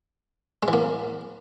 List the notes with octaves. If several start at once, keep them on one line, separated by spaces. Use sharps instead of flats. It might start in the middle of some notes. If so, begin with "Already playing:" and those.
G#3
E3
A#3